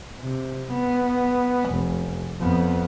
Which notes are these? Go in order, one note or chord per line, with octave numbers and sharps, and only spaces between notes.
C3
B3
F1
F2 B3